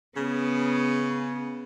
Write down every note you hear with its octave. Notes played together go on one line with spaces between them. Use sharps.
C#3 B3